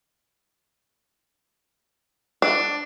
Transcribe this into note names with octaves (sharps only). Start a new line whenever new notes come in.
D4